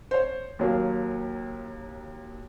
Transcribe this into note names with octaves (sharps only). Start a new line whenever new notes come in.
C5 C#5
D#2 F#3 A#3